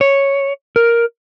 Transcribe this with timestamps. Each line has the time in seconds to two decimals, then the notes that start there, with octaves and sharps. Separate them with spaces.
0.01 C#5
0.76 A#4